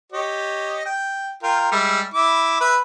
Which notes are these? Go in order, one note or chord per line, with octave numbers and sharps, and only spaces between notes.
G4 C#5 D#5
G5
F4 A#4 G5
G3 G#3 E5
E4 D6
B4 E5 B5